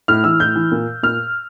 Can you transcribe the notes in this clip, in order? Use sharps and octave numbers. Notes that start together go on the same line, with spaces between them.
A2 F6
E3 E6
A2 G6
E3
A#2
A#2 F6